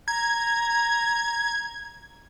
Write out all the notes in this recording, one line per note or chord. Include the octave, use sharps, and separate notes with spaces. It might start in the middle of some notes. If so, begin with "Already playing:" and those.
A#5 G#6